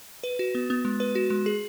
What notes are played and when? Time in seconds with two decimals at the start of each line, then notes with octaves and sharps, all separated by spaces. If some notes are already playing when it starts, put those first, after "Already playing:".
0.23 B4
0.39 F#4
0.55 B3
0.70 B3
0.85 G#3
1.00 B4
1.15 F#4
1.30 G#3
1.46 G#4